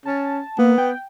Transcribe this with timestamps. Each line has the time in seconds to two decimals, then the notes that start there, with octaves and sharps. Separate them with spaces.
0.05 C#4 A5
0.59 A#3 B3
0.78 G5